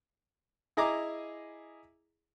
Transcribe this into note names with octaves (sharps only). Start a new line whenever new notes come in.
E4 G#4 D#5 A#5 D6